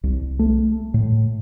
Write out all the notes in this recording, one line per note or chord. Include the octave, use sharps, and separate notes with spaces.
C2
A3
A2